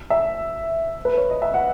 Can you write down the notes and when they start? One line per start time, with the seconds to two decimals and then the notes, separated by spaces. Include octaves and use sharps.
0.10 E5
1.05 B4
1.17 C#5
1.30 D#5
1.42 E5
1.54 F#5